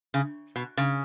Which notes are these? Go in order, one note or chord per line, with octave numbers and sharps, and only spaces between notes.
C#3
B2
C#3